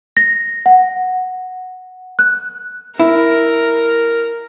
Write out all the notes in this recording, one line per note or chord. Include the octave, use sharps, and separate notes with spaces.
A#6
F#5
F#6
E4 A#4